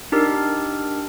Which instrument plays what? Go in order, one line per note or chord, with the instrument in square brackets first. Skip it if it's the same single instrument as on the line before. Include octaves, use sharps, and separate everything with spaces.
[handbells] D4 D#4 G4 A#4